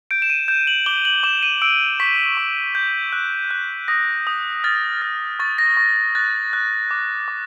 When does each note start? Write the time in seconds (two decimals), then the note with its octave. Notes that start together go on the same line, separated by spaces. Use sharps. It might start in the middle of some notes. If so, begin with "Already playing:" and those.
0.11 G6 D7
0.22 E7
0.30 D#7
0.48 G6 E7
0.67 F#7
0.86 D6 G7
1.05 F#7
1.23 D6 E7
1.43 D#7
1.62 E6 D7
2.00 C#6 B6
2.37 C#6
2.75 G6
3.13 F#6
3.51 F#6
3.88 D#6 A#6
4.27 D#6
4.64 F6 A6
5.02 F6 A6
5.39 C#6 A6
5.58 A#6
5.77 C#6 A#6
5.96 A#6
6.15 F#6 A6
6.53 F#6
6.91 D6
7.28 D6